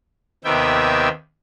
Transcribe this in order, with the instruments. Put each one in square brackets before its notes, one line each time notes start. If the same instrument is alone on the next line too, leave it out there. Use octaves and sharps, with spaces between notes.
[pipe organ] D#2 C3 D#3 B3 E5 G5